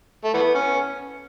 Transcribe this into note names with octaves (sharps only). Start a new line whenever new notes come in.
A3
E3 B3
C#4